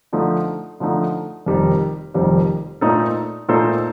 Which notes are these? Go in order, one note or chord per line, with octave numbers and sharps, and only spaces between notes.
D3 F3 A3 D#4
D3 F3 A3 D#4
F1 F2 D#3 G3
F1 F2 D#3 G3
A#2 A3 D#4 A4 C5
A#2 A3 D#4 A4 C5